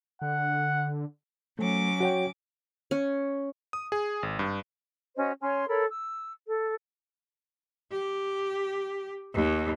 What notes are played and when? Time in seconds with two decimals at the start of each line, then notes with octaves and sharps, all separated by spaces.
0.22 D3 F#5
1.59 F#3 A3 C#4 D6
2.00 F#4 C#5 G5
2.91 C#4
3.73 D#6
3.92 G#4
4.23 G#1
4.39 G2
5.16 C#4 F#4 C5 D#5
5.41 C#4 C#5 G#5 C6
5.68 A4 A#4 C#5 B5
5.88 E6
6.47 A4
7.91 G4
9.34 D#2